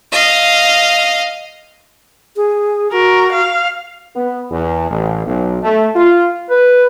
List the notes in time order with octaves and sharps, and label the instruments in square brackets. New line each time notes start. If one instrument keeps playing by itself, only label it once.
[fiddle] D#5 F5
[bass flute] G#4
[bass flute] F#4 [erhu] A#4
[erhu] F5
[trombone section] B3
E2
A1
B1
A3
F4
[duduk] B4